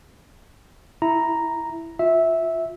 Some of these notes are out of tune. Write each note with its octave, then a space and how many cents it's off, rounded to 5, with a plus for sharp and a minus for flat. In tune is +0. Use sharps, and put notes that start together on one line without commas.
E4 +0 A#5 +0
F4 +20 E5 -10